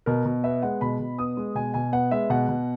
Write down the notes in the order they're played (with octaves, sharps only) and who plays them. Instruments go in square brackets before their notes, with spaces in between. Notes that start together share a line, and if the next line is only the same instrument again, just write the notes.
[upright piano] B2 A#4
B2
B3 E5
G#3 F#5
B2 B5
B2
B3 D#6
G#3
B2 G#5
B2 G#5
B3 F#5
G#3 E5
B2 F#5
B2